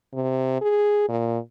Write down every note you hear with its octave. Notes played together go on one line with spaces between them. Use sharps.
C3
G#4
A#2